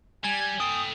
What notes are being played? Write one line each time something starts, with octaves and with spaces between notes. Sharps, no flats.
G3 G#5 G#6
A4 G5 D#6